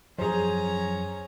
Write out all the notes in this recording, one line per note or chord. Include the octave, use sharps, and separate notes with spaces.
F#2 F3 C#4 G#4 C5 A#5